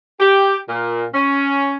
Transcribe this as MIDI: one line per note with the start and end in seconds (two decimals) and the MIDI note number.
0.20 0.58 67
0.68 1.06 46
1.14 1.77 61